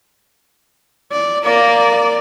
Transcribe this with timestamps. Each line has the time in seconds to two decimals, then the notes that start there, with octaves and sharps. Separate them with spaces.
1.12 D5
1.45 A#3 D5